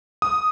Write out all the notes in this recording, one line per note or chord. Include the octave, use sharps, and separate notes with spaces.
D#6